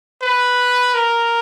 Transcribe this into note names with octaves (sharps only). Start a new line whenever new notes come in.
B4
A#4